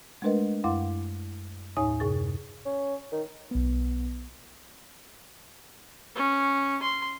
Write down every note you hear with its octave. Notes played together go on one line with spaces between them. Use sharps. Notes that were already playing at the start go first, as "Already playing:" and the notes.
G#3 A3 D4 A#4 B4 D#5
F#2 E4 F5 F#5 C6 D6
D#2 A2 D#4 C#5 G#5 D#6
F#2 C3 G#4 C#6 A6
C#4
D#3
B1 B3
C#4
C6